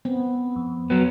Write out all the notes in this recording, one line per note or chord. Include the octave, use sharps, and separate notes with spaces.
B3 C4
F2
F#3 B3